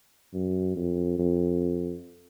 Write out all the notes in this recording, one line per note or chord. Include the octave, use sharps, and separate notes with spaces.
F#2
F2
F2